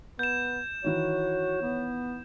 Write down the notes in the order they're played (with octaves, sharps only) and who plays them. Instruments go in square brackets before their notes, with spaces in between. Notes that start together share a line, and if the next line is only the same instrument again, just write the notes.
[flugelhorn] B3 [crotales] G6 E7
[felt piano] D#3 E3 [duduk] F#4 [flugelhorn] C#5
[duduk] B3